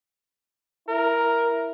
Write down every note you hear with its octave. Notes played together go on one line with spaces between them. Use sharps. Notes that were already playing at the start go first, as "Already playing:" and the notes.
E4 A#4